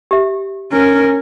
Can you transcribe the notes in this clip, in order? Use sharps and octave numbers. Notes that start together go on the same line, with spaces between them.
G4 E5
C#4 A#4